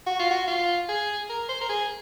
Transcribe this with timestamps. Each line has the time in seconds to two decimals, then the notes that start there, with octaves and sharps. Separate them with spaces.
0.06 F#4
0.19 F4
0.31 F#4
0.48 F4
0.89 G#4
1.29 A#4
1.48 C5
1.61 A#4
1.69 G#4